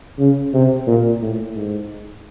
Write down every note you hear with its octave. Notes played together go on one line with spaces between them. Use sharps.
C#3
C3
A#2
A2
G#2